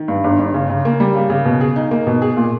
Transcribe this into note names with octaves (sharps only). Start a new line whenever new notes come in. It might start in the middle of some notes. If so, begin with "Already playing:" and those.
Already playing: D#3
G2
G1
G1
C#3
C#3
A#3
G3
C#3
C#3
B2
G#4
D#4
A#3
B2
G#4
A#2